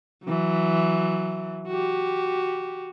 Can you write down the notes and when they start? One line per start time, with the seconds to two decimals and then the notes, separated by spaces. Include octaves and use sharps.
0.24 E3 F#3
1.67 F#4 G4